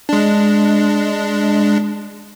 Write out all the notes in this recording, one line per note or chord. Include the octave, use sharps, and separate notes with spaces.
G#3 D4